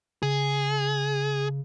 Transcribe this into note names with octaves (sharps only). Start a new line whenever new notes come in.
C#3 G#4